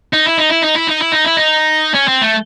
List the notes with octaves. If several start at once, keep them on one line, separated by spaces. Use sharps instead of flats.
D#4
E4
D#4
E4
D#4
E4
D#4
E4
D#4
E4
D#4
C#4
C4
A3